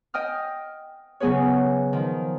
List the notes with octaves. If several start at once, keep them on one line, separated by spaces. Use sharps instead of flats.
D#5 G5 D#6 F6
C#3 F#3 B3 G#4 B4 C#5
D#3 F3